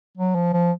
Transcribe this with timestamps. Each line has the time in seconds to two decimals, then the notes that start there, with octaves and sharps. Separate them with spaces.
0.17 F#3
0.35 F3
0.53 F3